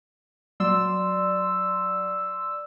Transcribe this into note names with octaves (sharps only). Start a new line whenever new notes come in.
F#3 D5 C6 E6